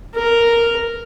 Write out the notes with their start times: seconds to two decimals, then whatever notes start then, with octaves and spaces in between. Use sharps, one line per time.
0.15 A#4